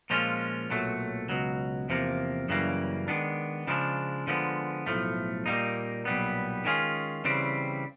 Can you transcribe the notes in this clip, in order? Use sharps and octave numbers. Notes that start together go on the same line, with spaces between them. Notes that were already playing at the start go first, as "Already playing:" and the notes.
A#2 F3 G#3 C#4 F4
B1 A#2 F#3 A3
C#2 B2 F#3
E2 C3 F3 A#3
F#2 C#3 E3 G3 A#3
D#3 G#3 B3 D4
C#3 F3 G#3 B3 D4
D3 F3 G#3 B3
B1 A2 F3 A3
A#2 G3 A#3 D#4
B1 A#2 G3 B3
D#3 G#3 C#4 F4 G#4
C#3 E3 G3 C4